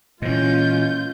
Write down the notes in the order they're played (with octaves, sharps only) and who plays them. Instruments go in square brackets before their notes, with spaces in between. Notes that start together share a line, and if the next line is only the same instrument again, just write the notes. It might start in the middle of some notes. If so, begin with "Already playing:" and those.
[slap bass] A#2 E3 [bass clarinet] G#3 [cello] C#4 [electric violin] F4 G6